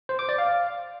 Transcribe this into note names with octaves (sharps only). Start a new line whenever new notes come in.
C5
D6
D5
F5